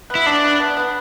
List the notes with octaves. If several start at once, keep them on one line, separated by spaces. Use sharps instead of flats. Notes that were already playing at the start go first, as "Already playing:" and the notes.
B3
E4
E3 D4
B3
B3
B3